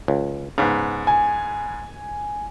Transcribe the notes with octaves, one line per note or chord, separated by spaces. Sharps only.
C#2
G#2 C#3 B3
G#5